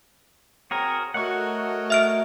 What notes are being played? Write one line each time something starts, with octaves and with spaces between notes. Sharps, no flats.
C4 F#4 G#4 A#4 C#5
A3 F#4 A#4 C#5 D#5 F#5 C#6
E5 F6 D7